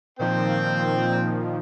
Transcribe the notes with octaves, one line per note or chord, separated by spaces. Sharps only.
A#2 D#3 F3 C4 G5